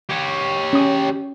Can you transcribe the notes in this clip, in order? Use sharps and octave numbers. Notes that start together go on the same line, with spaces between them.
G4 C#5
C#4 D#6